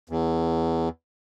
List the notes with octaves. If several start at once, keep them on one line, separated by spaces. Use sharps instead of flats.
E2